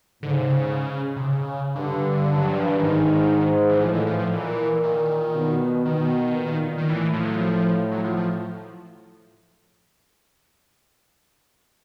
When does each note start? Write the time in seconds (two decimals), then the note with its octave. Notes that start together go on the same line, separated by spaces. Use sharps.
0.23 G#2 D3
0.30 C#3
0.38 C3
0.46 C#3
1.17 C3
1.24 C#3
1.76 G2 D3
2.27 G2
2.38 F#3
2.52 F3
2.65 E3
2.78 G#2 D#3
3.69 E3
3.81 A2 F3
3.94 E3
4.07 F3
4.19 F3
4.33 A#2 E3
4.84 D#3
5.35 B2
5.85 B2 D#3
6.37 A#2
6.78 D#3
6.88 A2 E3
7.14 F3
7.25 F#3
7.35 F3
7.92 F#3
8.04 F3
8.17 F3